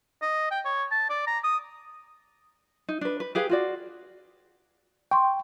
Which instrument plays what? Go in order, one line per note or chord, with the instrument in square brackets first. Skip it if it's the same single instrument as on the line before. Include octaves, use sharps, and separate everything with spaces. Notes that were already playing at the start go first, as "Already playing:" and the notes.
[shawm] D#5
G5
C#5
A5
D5
A#5
D#6
[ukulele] D#4
D4 B4
B4
G4 G#4 B4 F5
F4 F#4 D5
[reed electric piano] G5 [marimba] C6 C#6